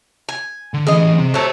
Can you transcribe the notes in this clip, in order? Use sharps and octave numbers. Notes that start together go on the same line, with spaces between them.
G#5
D3
E3 C#4 G#4 D#5
C3 C4
F#3 A3 C5 E5